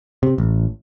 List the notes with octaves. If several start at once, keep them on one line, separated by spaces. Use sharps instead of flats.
C3
A1